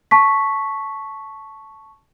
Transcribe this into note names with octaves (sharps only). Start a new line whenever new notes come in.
A5 C#6 B6